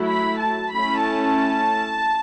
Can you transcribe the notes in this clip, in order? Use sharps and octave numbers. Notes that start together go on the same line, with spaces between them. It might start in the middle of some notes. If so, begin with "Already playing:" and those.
Already playing: F#3 A3 E4
B5
A5
A3 C#4 E4 B5
A5